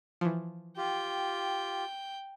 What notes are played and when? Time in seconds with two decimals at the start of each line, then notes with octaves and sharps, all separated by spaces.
0.21 E3 F3
0.77 F4 G4 G5